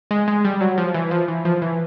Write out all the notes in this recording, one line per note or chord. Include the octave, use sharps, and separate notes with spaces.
G#3
G#3
G3
F#3
F3
E3
F3
E3
F3
E3